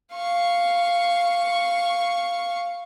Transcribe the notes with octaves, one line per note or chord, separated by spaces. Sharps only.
F5 C#6